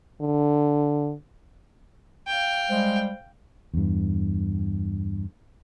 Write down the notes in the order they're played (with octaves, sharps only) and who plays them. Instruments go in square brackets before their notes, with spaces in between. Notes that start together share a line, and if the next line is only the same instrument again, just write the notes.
[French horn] D3
[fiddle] F5 G5
[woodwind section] G3 G#3 C5
[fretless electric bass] E2 G2